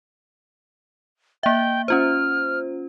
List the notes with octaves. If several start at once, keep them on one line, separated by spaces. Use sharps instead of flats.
A#3 E5 G5
C#4 F4 C5 F6